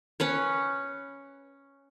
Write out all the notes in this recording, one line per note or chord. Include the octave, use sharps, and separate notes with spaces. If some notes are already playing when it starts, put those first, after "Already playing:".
C#4 B4 C#5